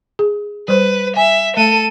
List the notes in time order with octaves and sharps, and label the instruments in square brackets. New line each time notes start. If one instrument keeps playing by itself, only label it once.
[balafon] G#4
[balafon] G3 C5 [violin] B4
[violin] E5 [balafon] G#5
[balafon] A3 [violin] A4 D#7